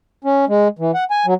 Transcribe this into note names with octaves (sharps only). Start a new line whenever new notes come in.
C#4
G#3
E3
F#5
G#5
F#3